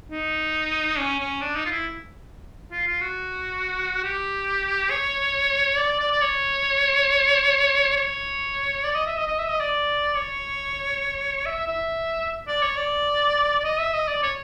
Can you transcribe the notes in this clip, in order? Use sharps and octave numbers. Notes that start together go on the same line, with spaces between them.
D#4
C#4
C#4
D4
D#4
F4
E4
F4
F4
F#4
G4
C#5
D5
D5
D5
C#5
C#5
D5
D#5
E5
D#5
D#5
E5
D#5
D5
C#5
E5
E5
D5
C#5
D5
D5
D#5
E5
D#5
D5
C#5